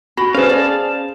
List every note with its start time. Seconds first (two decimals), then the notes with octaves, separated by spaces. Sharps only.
0.17 F#4 B5 A#6
0.35 C#4 G#4 B4 C5 F5 A5
0.49 G#4 D5